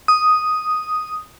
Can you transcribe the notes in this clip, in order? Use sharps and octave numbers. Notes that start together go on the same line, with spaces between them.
D#6